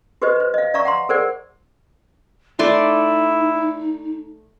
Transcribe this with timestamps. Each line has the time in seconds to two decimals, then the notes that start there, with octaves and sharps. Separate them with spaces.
0.22 F#4 G4 B4 C5 D#5
0.36 B4 C5
0.54 D#5 F5
0.74 D5 E5 F5 A#5 C#6
0.85 F#5 A#5 C6
1.09 G#4 A#4 C5 D5 F#5
2.59 A3 D#4 E4 D5 C6